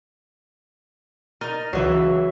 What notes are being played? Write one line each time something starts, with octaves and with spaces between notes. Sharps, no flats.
D#4 A#4 F6 A6 D#7
C#2 E3 F#3 E5